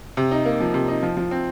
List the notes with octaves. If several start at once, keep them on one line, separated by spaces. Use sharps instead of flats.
C3
D#4
A#3
F3
C3
D#4
F3
F3
C4